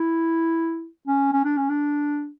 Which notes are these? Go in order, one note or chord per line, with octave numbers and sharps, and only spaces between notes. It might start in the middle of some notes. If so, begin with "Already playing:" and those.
Already playing: E4
C#4
C#4
D4
C#4
D4